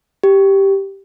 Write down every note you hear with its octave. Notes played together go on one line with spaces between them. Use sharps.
G4